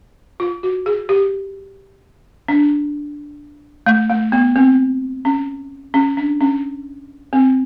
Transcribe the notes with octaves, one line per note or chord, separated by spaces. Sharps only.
F4
F#4
G#4
G4
D4
A3
A3
B3
C4
C#4
C#4
D4
C#4
C4